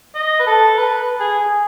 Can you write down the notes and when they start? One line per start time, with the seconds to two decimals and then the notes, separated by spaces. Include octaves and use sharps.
0.15 D#5
0.39 B4
0.47 A4
0.78 B4
1.20 G#4
1.40 G#4